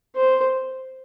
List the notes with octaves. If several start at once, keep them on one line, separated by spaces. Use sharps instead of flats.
C5